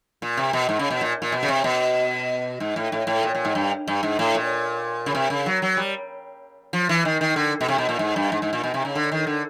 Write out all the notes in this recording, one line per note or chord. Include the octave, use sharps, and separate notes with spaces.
A#2
C3
B2
G#2
C#3
B2
A#2
A#2
B2
C#3
C3
B2
G#2
A2
A2
A2
A#2
A#2
G#2
G2
G2
G#2
A2
A#2
C#3
C3
C#3
F#3
F#3
G3
F3
E3
D#3
D#3
D3
B2
C3
B2
A#2
G#2
G2
G#2
G#2
A#2
B2
C3
C#3
D3
D#3
D3